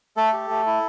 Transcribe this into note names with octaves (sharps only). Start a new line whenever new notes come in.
A3 A4
G4
A3
E4